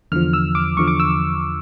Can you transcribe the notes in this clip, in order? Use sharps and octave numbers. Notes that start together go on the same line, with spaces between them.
E2 D3 F3 F6
E6
D6
E2 D3 F3 C#6
D6
E6